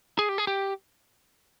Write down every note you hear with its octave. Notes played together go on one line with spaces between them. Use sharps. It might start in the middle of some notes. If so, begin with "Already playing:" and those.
G#4
G4
G#4
G4